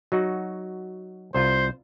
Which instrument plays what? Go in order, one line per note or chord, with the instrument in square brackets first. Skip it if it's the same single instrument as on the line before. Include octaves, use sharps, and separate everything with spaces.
[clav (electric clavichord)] F#3 D#4 F#4
[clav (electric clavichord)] C2 F4 [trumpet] C5